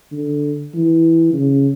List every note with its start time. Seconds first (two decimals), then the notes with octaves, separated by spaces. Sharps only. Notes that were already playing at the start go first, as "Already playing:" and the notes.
0.12 D3
0.75 E3
1.33 C#3